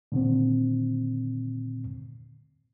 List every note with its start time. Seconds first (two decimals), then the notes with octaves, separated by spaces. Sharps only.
0.12 A#2 D3 D#3 C4